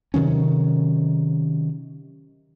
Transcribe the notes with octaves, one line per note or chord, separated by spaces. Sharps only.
C3 D#3 F#3 C#4